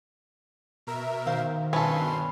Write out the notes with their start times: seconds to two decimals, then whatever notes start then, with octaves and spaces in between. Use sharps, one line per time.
0.87 B2 A#4 E5
1.26 D#3 C5 F5
1.73 G2 B2 C#4 A4 B4 C6